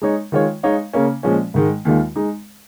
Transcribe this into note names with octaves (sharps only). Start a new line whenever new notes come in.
G#3 D#4 C#5
D#3 G#3 F4 C#5
G#3 D#4 C#5 F5
C#3 A#3 C#4
A#2 F3 G#3 C#4
G#2 D#3 G#3
D#2 D#3 G#3 F4
G#3 D#4